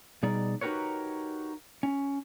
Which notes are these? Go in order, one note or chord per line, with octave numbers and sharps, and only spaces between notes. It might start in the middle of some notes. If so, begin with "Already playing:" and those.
B2 G3 D#4 G#4 D5
D#4 F#4 G4 A#4 B4 C#5
C#4